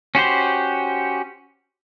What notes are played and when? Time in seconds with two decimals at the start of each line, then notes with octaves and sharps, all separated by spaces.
0.15 C#4 F#4 G4 C5